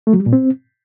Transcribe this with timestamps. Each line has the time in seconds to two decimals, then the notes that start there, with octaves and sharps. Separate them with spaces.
0.07 A3
0.13 F#3
0.20 G3
0.26 A#2
0.33 C4